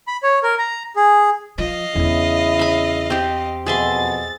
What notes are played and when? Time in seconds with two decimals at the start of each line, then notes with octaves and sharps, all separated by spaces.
0.07 B5
0.23 C#5
0.43 A#4
0.58 A#5
0.96 G#4
1.58 F3 D#5 F5
1.96 E2 C#3 D4 E4
2.59 E5 B5
3.10 C4 G4
3.66 F2 B2 G#4 E5 C6 A6